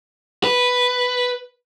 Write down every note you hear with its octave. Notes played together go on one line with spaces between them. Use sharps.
B4